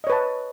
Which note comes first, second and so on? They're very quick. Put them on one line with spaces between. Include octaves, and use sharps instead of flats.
D#5 C#5 B4 A5